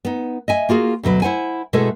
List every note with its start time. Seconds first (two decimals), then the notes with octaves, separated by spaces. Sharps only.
0.05 B3 D#4
0.48 D#5 E5 G#5
0.69 A#3 F4 F#4 G#4
1.03 D2 B2 F#3 B4
1.22 E4 C5 F#5 G#5
1.73 B2 G#3 A3 E4 G#4 A4